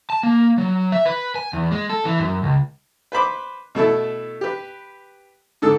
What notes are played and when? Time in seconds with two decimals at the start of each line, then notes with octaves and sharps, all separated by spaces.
0.10 A5
0.23 A#3
0.58 F#3
0.92 E5
1.06 B4
1.36 G#5
1.53 E2
1.72 G#3
1.90 A4
2.05 E3
2.20 F#2
2.43 C#2
3.12 B4 C5 B5 D6
3.75 B2 A3 E4 A4
4.41 G4 B4
5.62 G#2 D3 A4